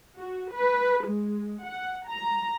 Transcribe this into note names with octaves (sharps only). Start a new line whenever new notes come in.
F#4
B4
G#3
F#5
A#5